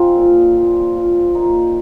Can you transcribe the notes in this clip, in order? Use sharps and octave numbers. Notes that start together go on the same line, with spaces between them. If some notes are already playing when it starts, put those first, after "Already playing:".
Already playing: F3 C4 D#4 F4 G#4
A#2
A#2
F3
A#2 D#4